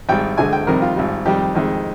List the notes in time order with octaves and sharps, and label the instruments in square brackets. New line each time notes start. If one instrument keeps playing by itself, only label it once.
[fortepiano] G#1 G#2 G3 G5
D2 D3 G#3 G#5
G5
F2 C3 D#3 G3 A#4
F4
G#1 G#2 G3
F2 D#3 G3 G4
F2 D#3 G#3